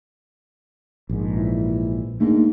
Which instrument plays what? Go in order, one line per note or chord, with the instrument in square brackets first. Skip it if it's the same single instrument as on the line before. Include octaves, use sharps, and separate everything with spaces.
[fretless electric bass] A#1 G#2
[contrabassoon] E3
[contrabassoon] G#2 [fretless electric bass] A3 A#3 D4